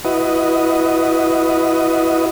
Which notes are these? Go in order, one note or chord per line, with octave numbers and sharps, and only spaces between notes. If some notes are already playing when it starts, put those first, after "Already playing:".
E4 F#4 B4 D#5